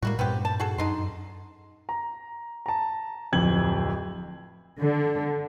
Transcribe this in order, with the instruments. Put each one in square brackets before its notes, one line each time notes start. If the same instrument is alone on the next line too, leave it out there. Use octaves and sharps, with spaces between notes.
[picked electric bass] A2 G3 G#3 [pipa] A#3 E4 F#4
[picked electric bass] G2 A#2 [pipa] B3 C4 G4
[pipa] A5
F#4 G#4 A4
[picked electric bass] F#2 [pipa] D3 D#4 C6
[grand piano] A#5
A5 A#5
D1 F2 G#6 F#7
[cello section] D3